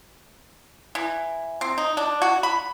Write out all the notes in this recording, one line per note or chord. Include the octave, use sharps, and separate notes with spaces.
E3
C4
D#4
D4
F#4
B5